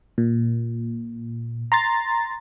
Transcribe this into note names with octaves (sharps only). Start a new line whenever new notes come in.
A#2
A#5 C6 A6